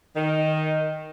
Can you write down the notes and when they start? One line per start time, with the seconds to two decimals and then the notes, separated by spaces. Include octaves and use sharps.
0.15 D#3